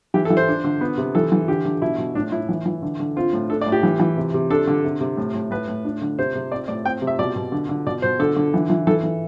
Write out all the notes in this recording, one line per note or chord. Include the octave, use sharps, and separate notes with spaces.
E3 G4
A4
E3
C5
D4
D3
B3
C3
E3 A4
E3
D3 G4
D3
B2 E4
B2
A2 D4
A2 E4
E3
E3
D3
D3
C4 F4
A2
D4 A4
D5
A2
G4
E3
E3
C3
C3
D4 A4
D3
C3
C3
A2
A2
A2 B4
A2
D4
D3
C3 C5
C3
C4 D5
A2 D5
C4 G5
C3
E5
B2 D5
B2
D3
D3
B2 D5
B2 C5
D3 A4
D3
E3
E3
E3 A4
E3